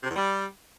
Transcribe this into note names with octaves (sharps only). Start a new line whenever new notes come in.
C3
E2
G3